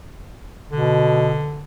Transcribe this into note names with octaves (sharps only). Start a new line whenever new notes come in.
B2 D3